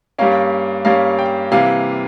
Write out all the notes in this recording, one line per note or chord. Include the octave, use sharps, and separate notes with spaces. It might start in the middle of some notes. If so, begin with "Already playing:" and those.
G2 G3 A#3 C#4 F5
G2 G3 A#3 C#4 F5
G5
C3 E3 G3 A#3 F5